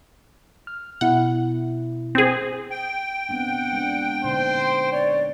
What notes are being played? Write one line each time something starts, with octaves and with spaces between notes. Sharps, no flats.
F6
B2 E4 F#5
C4 G#4
G5
B3 C4 D4 F#5
G#3 D4
A#2 D3 D#4 C5
C#5 D5